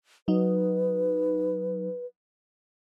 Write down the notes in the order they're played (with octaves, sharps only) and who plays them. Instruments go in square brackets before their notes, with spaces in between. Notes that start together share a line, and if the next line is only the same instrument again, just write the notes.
[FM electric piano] F#3 D#4 [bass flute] B4